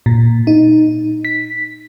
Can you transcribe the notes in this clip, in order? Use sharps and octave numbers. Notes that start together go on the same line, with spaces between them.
A#2
D#4
B6